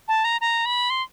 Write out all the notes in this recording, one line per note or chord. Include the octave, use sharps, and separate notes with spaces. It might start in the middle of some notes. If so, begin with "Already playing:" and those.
A5
A#5
A#5
B5
C6